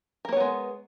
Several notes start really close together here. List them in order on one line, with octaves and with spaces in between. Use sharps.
A#4 A#3 C#5 B3 G#3